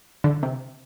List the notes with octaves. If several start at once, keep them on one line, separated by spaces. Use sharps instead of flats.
D3
C3